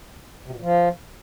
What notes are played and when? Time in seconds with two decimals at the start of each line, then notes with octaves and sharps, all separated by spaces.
0.46 C3
0.51 B2
0.56 A#2
0.61 F3